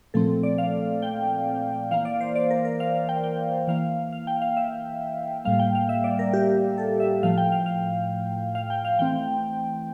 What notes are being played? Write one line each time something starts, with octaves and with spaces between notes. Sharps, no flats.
A#2 F3 A3 C4 A4
D5
F5
G5
E3 A#3 F5
D5
C5
D5
A#4
A#4
F5
F5
G5
G5
E3 A#3 F5
F5
G5
F5
E5
A2 G3 A#3 F5
G5
F5
E5
D5
A#4
G4
A4
E5
A2 F3 A3 F5
G5
F5
F5
F5
G5
F5
E3 A3 C4 G5